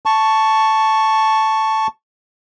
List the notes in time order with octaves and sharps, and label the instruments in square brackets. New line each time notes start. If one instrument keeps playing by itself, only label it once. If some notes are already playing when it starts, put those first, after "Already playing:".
[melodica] A5 C#6